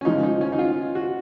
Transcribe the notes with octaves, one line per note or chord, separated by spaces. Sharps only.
C#4
C#3 F3 G#3 D#4
D#4
C#4
D#4
F4
F#4